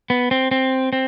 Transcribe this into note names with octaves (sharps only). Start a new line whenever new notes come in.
B3
C4
C4
C4